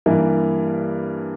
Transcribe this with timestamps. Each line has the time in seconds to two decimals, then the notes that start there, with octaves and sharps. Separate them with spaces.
0.06 G2 E3 A#3